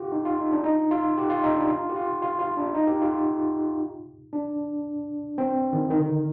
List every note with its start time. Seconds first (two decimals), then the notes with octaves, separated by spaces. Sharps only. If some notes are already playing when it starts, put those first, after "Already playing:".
Already playing: F4 G4
0.12 D#4
0.25 F4
0.39 D#4
0.52 D4
0.64 D#4
0.91 F4
1.18 G4
1.30 F4
1.44 D#4
1.56 D4
1.70 F4
1.89 G4
1.96 F4
2.22 F4
2.39 F4
2.57 D4
2.75 D#4
2.87 G4
3.02 F4
4.33 D4
5.38 C4
5.73 D#3
5.90 D#3
5.98 D3
6.06 D#3